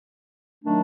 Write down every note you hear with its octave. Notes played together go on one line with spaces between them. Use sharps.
D#3 F#3 A3 D4